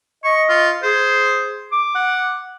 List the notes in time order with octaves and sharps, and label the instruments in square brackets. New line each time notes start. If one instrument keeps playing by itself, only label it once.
[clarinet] D#5 [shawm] C#6
[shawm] F4
[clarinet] G#4 [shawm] C5
[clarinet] D6
[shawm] F#5